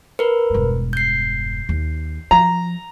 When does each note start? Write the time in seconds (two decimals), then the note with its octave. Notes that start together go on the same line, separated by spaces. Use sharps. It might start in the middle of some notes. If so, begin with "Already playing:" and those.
0.19 A#4 B4
0.50 E1 G2
0.93 G6 C7
1.69 D#2
2.31 F3 A#5